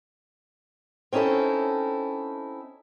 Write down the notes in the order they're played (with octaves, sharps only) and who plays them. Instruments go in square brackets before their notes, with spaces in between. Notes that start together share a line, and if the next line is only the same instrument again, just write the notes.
[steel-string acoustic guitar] C4 C#4 D#4 E4 A4